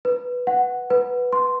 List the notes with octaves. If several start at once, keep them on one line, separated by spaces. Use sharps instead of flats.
B4
F#5
B4
C6